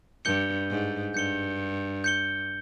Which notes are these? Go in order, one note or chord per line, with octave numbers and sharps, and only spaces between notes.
G2 G6 C#7 G7
G#2
G2 G6 C#7 G7
G6 C#7 G7